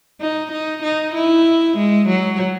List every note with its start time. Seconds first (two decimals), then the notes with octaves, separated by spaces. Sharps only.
0.21 D#4
0.52 D#4
0.83 D#4
1.15 E4
1.77 G#3
2.08 F#3